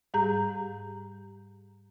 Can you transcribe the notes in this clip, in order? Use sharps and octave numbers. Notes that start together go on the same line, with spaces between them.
G#2 G3 G4 G#4 A#5 G6